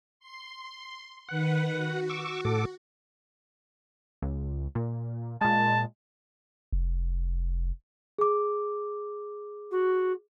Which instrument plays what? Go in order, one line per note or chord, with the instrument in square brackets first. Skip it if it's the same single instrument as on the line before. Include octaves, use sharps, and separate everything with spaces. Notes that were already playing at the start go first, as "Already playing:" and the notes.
[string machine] C6
[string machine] D#3 B4 [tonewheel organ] F#5
[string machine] F#4
[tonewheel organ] C#6 D6 E6
A2 A4 D6
[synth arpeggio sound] C#2
A#2
[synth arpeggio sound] A#2 G#3 [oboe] A5
[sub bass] F1
[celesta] G#4 D6
[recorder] F#4